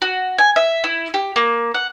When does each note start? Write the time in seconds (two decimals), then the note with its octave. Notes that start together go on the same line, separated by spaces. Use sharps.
0.02 F#4
0.38 G#5
0.56 E5
0.84 E4
1.14 G4
1.36 A#3
1.74 F#5